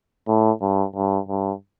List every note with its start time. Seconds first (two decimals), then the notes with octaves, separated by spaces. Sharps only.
0.28 A2
0.61 G2
0.95 G2
1.28 G2